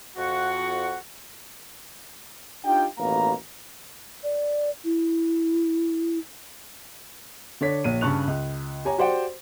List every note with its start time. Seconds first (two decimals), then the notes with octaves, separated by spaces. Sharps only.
0.16 F2 F#4 F#5
2.65 D4 D#4 F4 G4 G5
2.98 A1 D#2 B2 A#3 F5 A#5
4.24 D5
4.84 E4
7.61 D3 D4 C#5 B6
7.84 A#1 C#5 D#7
8.01 G2 C#3 A5 C#6 F#6 F7
8.27 C#2
8.85 G4 C#5 G#5 A#5
8.98 F#4 G4 C5 D5 F#5 G5